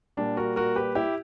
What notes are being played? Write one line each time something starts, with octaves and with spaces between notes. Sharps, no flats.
A#2 G3 D4
F#4 A#4
F#4 A#4
G4 B4
E4 G4